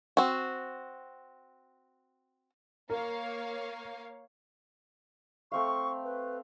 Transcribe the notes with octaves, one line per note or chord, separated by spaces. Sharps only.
C4 F#4
A#3 A#4 C#5 F5
A3 C4 F5 C#6
B4